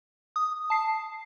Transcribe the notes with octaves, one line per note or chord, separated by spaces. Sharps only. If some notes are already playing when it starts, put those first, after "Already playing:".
D#6
A5 C7